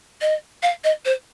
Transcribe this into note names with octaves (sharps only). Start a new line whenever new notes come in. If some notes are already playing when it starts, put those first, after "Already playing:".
D#5
F5
D#5
C5